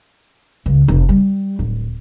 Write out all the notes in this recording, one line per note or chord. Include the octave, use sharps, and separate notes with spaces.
C#2
F1
G3
D1